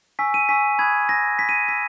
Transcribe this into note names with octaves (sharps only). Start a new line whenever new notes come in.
G#5 C#6 E6 B6
D#7
G#5 C#6 E6 B6
B5 D#6 F#6 G#6
B5 D#6 F#6 A#6
B5 E6 B6
D#7
B5 E6 B6